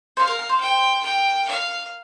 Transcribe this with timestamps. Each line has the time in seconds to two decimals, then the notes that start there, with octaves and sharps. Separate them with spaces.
0.17 C5 F5
0.27 A#4
0.39 A#4
0.49 C5
0.61 G5
1.04 A#4 G5
1.48 F5